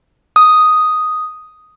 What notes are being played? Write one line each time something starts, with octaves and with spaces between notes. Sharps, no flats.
D#6